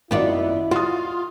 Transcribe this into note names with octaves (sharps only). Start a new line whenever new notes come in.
G#1 F#2 B3 E4 F4 D5 D#5
F4 F#4 C6 D#6